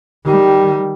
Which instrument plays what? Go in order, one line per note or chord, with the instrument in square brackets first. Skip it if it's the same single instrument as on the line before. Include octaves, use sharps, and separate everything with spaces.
[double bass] D#3 G3